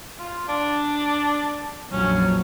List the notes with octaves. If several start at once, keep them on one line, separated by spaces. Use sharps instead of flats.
F4
D4
A#1 F2 F#3 C#4